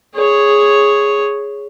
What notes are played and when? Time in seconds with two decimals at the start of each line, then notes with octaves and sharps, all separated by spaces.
0.15 G#4 C#5